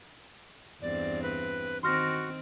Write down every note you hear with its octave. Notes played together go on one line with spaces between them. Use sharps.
E2 G2 C4 D5
B4
D#3 C4 F#4 C6 F6 A#6